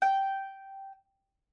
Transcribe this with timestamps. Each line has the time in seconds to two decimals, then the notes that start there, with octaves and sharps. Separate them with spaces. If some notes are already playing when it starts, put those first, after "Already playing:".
0.02 G5